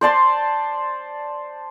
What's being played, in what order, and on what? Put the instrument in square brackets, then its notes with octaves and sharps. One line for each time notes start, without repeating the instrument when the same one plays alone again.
[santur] C5 D5 A5 C6